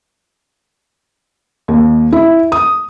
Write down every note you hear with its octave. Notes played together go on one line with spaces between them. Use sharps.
D#2
E4
D#6